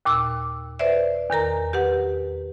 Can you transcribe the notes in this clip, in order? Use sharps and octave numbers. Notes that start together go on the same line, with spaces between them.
D#2 A#2 D6 E6
B4 C5 D5 E5
E2 D#3 A#4 A#5
G4 B4 F#5